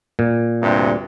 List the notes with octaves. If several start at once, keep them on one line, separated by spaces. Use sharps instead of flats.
A#2
D2 G2 C3